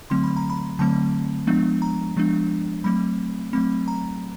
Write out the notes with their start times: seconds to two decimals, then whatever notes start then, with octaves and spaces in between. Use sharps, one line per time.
0.10 D3 F#3 A3 C4 C6
0.24 B5
0.37 A#5
0.50 B5
0.79 D3 F#3 A3 C4 A5
1.47 F3 G#3 B3 D4
1.82 A#5
2.17 F3 G#3 B3 D4
2.84 F#3 A3 C4 B5
3.53 F#3 A3 C4 B5
3.88 A#5